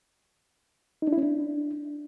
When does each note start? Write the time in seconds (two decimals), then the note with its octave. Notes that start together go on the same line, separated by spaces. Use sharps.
1.02 D#4
1.07 D4
1.13 E4
1.18 C#4
1.23 D4